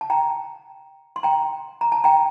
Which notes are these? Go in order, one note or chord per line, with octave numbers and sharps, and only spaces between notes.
A5
G5 A#5
C6
G5 A#5
A#5
A5
G5 A#5